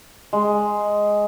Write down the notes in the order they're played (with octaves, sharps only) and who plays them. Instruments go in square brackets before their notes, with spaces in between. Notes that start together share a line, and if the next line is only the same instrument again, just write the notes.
[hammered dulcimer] G#3